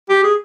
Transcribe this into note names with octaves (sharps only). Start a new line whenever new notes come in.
G4
G#4